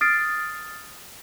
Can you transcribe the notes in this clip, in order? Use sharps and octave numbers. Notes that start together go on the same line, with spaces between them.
D#6 F6 A6 C7 D7